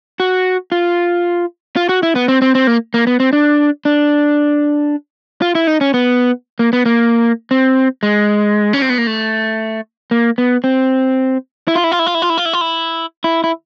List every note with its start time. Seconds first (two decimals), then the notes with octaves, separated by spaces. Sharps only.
0.20 F#4
0.72 F4
1.76 F4
1.89 F#4
2.03 E4
2.15 B3
2.28 C4
2.42 C4
2.55 C4
2.67 A#3
2.94 A#3
3.07 B3
3.20 C4
3.33 D4
3.85 D4
5.42 F4
5.55 E4
5.67 D#4
5.81 C#4
5.94 B3
6.59 A#3
6.73 B3
6.85 A#3
7.51 C4
8.03 G#3
8.73 C#4
8.82 C4
8.90 B3
8.98 A#3
9.07 A3
10.11 A#3
10.38 B3
10.64 C4
11.68 E4
11.75 F4
11.84 E4
11.92 F4
11.99 E4
12.07 F4
12.15 E4
12.22 F4
12.30 E4
12.38 F4
12.45 E4
12.53 F4
12.61 E4
13.24 E4
13.44 E4